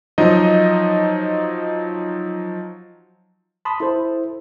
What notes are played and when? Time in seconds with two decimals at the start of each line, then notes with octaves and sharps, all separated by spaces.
0.18 F3 F#3 D#4 D#5
3.65 A5 B5 C6 D#6
3.80 E4 A4 C5